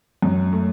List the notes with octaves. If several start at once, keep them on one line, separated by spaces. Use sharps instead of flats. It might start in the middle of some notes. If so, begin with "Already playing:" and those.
F#2
A3